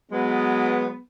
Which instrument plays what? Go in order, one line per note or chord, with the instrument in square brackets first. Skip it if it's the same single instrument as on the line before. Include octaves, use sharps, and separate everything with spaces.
[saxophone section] F#3 G#3 B3